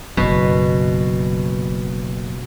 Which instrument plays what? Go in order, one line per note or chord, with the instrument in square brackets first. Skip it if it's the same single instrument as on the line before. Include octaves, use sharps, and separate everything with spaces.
[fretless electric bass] F#1 F#2 [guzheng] B2 B4